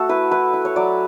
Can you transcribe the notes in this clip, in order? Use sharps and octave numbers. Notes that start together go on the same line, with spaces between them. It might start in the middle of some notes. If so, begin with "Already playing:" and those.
Already playing: A3 F#4 A4
E4 B4
E4 B4
E4
C#5
F#3 D5